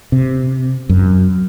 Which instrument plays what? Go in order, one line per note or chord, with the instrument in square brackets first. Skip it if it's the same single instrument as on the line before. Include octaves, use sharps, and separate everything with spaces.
[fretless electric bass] C3
F#2